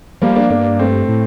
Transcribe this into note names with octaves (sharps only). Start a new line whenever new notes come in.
F3 G3 A#3
A#3 D4
G2 A#3 D4
A3 C4
A2